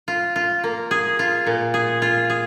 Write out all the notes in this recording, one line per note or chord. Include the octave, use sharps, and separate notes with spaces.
F4
F4
A#3
G#4
F4
A#2
G#4
F4
G#4